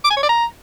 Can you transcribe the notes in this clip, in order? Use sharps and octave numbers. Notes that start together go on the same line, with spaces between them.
D6
G#5
C#5
D5
A#5